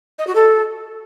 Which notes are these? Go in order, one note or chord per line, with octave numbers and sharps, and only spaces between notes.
D#5
F#4
A4